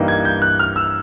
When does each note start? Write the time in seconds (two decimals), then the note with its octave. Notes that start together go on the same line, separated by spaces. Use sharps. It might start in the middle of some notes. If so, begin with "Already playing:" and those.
Already playing: G2 E3 G3 A#3 D#4
0.08 G#6
0.25 G6
0.42 F#6
0.59 F6
0.76 E6